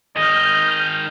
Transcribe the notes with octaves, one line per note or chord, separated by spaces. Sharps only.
D#3 G#4 D#5 F6 G6